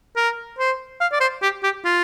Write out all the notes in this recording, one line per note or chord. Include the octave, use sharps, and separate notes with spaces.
A#4
C5
F5
D5
C5
G4
G4
F4